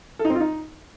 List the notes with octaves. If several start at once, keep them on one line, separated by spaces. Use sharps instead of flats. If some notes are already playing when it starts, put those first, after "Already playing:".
A4
D#4
C4
F4
D#4